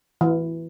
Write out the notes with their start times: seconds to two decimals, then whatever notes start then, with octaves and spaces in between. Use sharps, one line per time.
0.21 E3